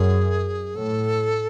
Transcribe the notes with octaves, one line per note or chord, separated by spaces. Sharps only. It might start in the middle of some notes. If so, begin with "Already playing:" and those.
Already playing: F#2 G#4
A2 A4